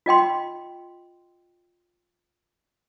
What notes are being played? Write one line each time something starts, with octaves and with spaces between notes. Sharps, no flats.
F4 D#5 G5 C6